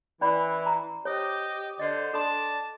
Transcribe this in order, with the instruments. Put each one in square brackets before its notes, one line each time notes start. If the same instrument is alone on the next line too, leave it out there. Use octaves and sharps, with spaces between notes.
[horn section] E3 [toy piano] C#4 D5 B5
[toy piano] A#5
[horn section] G4 D#5 [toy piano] C5 C#5
[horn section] D3 C5 [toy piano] D#5
[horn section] D4 A5 [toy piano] A4 C6